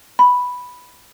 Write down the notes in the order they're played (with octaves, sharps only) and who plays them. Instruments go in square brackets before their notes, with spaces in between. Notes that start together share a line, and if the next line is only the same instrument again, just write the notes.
[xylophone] B5